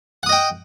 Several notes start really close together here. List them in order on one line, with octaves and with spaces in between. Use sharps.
F#5 D#6 D#5 G5